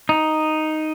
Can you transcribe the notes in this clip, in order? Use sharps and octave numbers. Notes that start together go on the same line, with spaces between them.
D#4